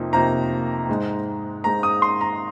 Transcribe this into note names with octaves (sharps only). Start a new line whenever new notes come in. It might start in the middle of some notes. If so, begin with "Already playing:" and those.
Already playing: F2 C3 F3 A#3 D#4
F2 C3 F3 A#3 D#4 A#5
G#2 G#3 D#4
G#2 G#3 D#4 A#5
D#6
C6
A#5